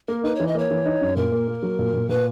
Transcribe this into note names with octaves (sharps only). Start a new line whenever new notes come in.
A#3 A#4
D#4 B4
E3 C#5
D#5
A#3 C#5
E3
D#4
F#2
A#2 A#4
A#3
A#3
F#3
A#2
A#2
A#2 B4